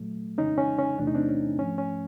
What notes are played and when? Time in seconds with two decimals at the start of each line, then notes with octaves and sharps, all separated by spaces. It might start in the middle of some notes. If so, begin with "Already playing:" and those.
Already playing: A#2 F#3 A3
0.38 F2 C#3 E3 G#3 C#4 D#4
0.58 C#4
0.79 C#4
0.98 E2 C3 E3 A3 D4
1.07 D#4
1.15 C4 D4
1.29 C#4
1.58 G#2 F3 A3 C#4
1.78 C#4